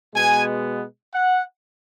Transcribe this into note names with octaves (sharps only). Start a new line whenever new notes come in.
B2 G#3 B3 G#5
F#5